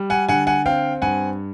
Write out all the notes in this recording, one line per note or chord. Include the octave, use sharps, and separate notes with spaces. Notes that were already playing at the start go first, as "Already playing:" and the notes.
Already playing: G3
F#5 G#5
D3 F#5 G#5
F#5 G#5
C4 F5 G5
G2 F#5 G#5